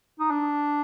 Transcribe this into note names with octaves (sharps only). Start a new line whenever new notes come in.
D#4
D4